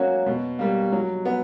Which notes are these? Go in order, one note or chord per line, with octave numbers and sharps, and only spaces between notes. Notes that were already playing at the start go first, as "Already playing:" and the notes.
Already playing: F#3 A#3 C#4 F#4 C#5
B2
G3 A#3
F#3
B3